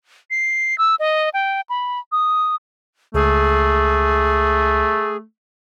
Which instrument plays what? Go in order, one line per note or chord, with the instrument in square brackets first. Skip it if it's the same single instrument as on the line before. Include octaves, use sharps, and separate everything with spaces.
[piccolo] C7
E6
D#5
G5
B5
D#6
[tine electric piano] C#2 [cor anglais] A3 [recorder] G#4